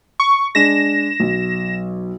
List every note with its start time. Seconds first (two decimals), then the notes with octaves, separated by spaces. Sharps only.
0.20 C#6
0.55 G#3 D4 A#6 B6 E7
1.20 B1